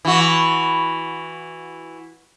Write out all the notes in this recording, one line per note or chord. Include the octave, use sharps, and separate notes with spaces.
E3 F#4